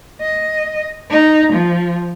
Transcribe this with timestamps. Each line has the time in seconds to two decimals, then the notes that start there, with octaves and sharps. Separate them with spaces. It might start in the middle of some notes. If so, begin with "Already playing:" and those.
0.21 D#5
1.11 D#4
1.53 F3